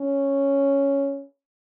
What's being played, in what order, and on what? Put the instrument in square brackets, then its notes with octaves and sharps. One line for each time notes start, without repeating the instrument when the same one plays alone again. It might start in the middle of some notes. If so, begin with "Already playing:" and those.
Already playing: [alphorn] C#4